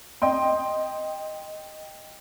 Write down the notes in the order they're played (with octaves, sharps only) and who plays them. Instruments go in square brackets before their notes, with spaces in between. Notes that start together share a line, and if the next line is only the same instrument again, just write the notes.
[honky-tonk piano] D#5 G5 C6